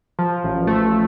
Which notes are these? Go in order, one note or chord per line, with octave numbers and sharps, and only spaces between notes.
F3
A1
A3